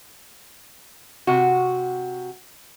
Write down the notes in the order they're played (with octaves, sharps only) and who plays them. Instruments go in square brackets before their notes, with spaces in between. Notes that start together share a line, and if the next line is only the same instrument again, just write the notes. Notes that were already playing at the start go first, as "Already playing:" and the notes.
[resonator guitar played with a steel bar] C3 F#4